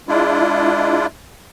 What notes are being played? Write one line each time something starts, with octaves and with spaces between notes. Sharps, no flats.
G#3 D4 E4 F4